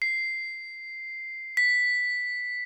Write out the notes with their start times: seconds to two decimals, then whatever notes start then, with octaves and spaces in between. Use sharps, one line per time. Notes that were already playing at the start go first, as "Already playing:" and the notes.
0.02 C7
1.57 B6